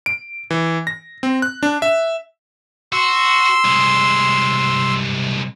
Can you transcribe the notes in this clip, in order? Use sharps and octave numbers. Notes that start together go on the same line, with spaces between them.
D7
E3
A#6
C4
F#6
D4
E5
F#4 C6 E6
C2 G#3